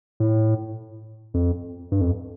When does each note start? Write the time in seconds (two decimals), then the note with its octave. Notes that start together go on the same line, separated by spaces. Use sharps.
0.20 A2
1.34 F2
1.92 G2
2.01 F2